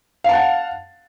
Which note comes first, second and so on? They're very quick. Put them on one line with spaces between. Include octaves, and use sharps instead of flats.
F5 A5 F#5